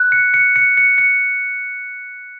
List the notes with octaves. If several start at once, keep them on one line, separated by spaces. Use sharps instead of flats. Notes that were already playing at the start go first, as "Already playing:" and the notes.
Already playing: F#6
C#7
C#7
C#7
C#7
C#7